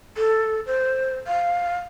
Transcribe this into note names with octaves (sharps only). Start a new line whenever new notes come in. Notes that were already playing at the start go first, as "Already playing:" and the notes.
A4
C5
F5